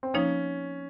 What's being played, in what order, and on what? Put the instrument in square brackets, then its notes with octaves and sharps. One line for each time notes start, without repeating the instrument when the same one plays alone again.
[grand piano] C4
[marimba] F3 A#3 D#4 [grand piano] C#4